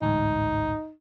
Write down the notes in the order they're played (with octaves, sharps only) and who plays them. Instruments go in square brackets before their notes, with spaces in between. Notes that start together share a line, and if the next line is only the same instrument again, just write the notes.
[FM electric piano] A1 D2 G#2 [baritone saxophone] D#4